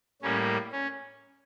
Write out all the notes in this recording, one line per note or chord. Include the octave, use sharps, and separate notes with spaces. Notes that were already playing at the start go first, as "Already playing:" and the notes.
A2 G3 A#3 C#4
C#4